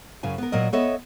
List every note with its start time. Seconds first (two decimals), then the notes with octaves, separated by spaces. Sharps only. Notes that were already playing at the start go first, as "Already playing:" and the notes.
0.23 F#2 C#3 G#5
0.38 B3 A#4
0.52 A#2 F#3 A#4 D#5
0.73 B3 A4 C#5 D#5 E5